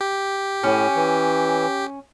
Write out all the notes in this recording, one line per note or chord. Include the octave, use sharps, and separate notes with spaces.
G4
A2 C#4
E3